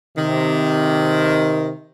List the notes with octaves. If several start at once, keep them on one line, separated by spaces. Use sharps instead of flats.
C3 D#3